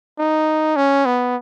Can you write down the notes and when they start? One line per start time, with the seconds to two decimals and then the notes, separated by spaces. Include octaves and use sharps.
0.19 D#4
0.76 C#4
1.06 B3